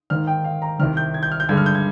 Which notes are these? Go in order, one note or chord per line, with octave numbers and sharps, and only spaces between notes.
G#2 D#3 A#3 F6
G5
F5
A#5
C2 C3 D#3 F6
G6
G#6
G6
F6
G6
G2 D3 G#3 G#6
F6
G6
G#6